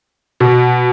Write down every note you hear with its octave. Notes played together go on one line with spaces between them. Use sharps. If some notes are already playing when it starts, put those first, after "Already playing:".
B2